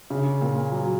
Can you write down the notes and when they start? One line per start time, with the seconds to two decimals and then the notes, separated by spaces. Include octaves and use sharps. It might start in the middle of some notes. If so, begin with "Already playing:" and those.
0.10 C#3
0.41 A#2
0.72 F#3